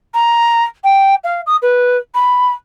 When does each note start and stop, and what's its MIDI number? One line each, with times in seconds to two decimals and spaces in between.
0.14 0.65 82
0.84 1.15 79
1.24 1.41 77
1.47 1.56 87
1.62 1.97 71
2.15 2.52 83